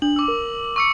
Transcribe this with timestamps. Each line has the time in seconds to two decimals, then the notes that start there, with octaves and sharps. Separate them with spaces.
0.02 D4 F#7
0.16 D6 E6
0.28 A#4
0.76 C#6 E6 C#7